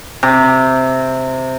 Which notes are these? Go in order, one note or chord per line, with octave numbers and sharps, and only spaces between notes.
C3